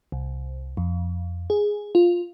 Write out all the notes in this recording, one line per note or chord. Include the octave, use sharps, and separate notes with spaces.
C2
F2
G#4
F4